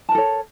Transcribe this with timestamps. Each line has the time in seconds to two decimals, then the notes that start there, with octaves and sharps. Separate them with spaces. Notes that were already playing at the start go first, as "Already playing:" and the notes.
0.09 A5
0.12 A#4
0.15 A4
0.18 C#5